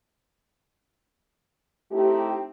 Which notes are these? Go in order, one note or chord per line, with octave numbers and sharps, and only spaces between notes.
A3 C4 D#4 E4 G4